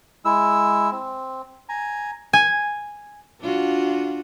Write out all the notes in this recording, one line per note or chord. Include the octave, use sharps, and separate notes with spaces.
G#3 E4 E6
C4
G#5 A#5
G#5
D4 F4 F#4